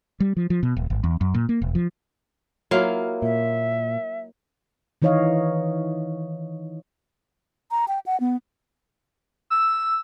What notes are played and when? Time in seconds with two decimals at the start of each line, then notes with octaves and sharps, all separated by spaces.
0.20 G3
0.37 F3
0.50 F3
0.63 B2
0.77 D#1
0.90 G#1
1.04 E2
1.21 F#2
1.34 A#2
1.49 A#3
1.62 E1
1.75 F3
2.71 F#3 A#3 E4 F4 F5
3.22 A#2 E5
5.02 D#3 E3 D#4 C#5 D#5 F5
7.71 A#5
7.88 G5
8.06 F#5
8.20 B3
9.50 E6